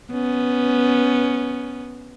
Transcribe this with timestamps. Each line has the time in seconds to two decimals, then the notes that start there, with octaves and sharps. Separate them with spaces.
0.13 B3 C#4